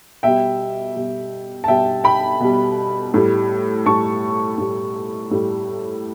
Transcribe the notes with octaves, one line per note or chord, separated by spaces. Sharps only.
B2 G3 E5 G5
B2 G3
A5
B2 G3 E5 G5
G5 B5
B2 G3
A2 G3
A2 G3 A5 C#6
A2 G3
A2 G3